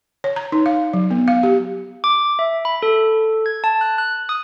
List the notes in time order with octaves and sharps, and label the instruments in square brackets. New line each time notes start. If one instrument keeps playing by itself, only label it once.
[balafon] C#5
A#5
D#4
F5
F#3
B3
F5
G4
[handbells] D6
E5
B5
A4
G#6
A5
F#6
F#6
D#6